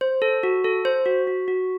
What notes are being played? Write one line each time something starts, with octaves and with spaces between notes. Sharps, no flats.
C5
A4
F#4
A4
C5
F#4
F#4
F#4